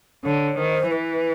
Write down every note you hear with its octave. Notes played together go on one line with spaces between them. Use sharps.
D3 C#5
D#3 C5
E3 B4